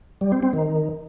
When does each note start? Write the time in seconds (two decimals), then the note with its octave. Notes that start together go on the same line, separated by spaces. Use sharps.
0.21 G3
0.32 C4
0.43 C4
0.53 D#3